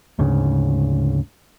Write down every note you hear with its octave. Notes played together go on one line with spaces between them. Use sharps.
D2 G#2 C#3